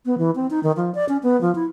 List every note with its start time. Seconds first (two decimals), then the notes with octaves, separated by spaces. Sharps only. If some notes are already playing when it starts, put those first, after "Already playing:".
0.06 B3
0.18 E3
0.36 C4
0.50 D#4
0.63 D#3
0.77 F3
0.95 D5
1.09 C#4
1.23 B3
1.41 F3
1.55 E4